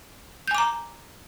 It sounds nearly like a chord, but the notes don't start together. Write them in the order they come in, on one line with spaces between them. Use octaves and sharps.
G6 G#5 D6 A#5